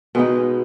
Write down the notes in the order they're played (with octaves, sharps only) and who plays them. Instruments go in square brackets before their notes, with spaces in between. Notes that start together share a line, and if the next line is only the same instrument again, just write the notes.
[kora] B2 G#3 B3 D#4